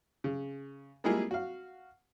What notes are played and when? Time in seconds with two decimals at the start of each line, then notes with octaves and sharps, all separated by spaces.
0.24 C#3
1.04 G3 G#3 A#3 E4 F4 G#4
1.31 F#4 F5